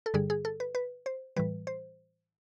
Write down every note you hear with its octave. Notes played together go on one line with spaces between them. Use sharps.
A4
G2 D3 G3 G#4
G#4
A4
B4
B4
C5
A2 E3 G3 B4
C5